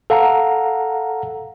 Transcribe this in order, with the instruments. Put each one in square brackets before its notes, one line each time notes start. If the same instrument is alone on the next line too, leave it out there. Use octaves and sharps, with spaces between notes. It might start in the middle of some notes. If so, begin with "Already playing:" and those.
[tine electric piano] A4 F5 F#5 A#5